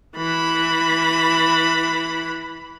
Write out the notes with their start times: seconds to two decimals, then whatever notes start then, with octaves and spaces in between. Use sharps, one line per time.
0.17 E3 B5